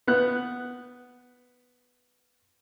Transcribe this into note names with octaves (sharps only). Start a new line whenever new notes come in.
B3 F#6